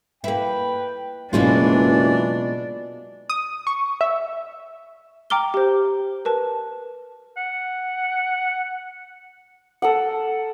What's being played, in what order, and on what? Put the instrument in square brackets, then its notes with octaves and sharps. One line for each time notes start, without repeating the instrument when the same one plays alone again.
[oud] A#3 E4 [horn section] B4 G5
[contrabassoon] F#1 [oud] B2 G#3 F4 [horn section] E3 [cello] D4
[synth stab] D#6
C#6
E5
[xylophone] G5 A#5 D6 F6 G7
G4 C5
A#4 B4 A5
[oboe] F#5
[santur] A4 A#4 F#5